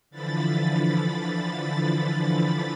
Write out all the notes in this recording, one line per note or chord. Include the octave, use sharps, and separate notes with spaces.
D3 E3 F3 B5 A6